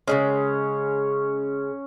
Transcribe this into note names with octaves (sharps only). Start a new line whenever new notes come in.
C#3 E3 G#3 C#4